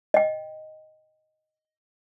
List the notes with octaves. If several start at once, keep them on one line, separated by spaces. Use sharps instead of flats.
D#5 G5